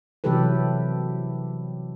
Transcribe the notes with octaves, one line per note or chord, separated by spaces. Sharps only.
C3 E3 F#3 G4 A4 B4